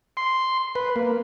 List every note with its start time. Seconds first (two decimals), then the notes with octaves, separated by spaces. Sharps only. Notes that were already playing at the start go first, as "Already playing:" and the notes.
0.17 C6
0.75 B4
0.96 A#3